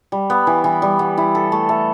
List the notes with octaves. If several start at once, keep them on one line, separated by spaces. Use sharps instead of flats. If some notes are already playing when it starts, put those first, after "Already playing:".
G3
B3
E3
E3
G3
B3
E4
A4
A3
A3